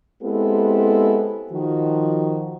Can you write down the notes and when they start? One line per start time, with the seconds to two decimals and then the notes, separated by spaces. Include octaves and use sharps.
0.23 G#3 B3 C4 E4 G4 A4
1.52 D#3 F3 F#4